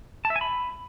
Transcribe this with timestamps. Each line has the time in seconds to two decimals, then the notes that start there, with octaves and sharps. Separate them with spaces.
0.25 A5
0.30 E5
0.36 G#5
0.41 B5